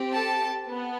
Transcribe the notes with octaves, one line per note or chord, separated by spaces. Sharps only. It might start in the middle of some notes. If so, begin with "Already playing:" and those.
Already playing: C4 G4
A4 A5
B3